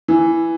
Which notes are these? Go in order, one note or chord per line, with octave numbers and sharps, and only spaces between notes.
E3